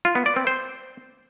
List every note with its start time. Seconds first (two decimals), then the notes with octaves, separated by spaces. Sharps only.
0.05 F4
0.15 B3
0.26 D5
0.36 C4
0.47 C5